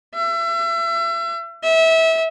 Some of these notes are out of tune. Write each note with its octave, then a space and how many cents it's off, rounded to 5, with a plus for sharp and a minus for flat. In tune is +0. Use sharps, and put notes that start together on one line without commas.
E5 +35
E5 -25